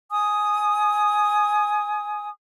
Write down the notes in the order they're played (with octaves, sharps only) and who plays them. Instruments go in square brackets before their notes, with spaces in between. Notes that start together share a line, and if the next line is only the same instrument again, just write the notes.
[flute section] G#5 D#6